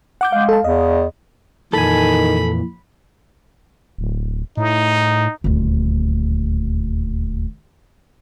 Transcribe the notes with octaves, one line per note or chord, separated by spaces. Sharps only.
F#5 D6 G6
G#3 F5
A4 A5
E2 D#5
F2 A#2 D#3 E3 A4 G#5 B5
D1
A2 D#4
D#1 D2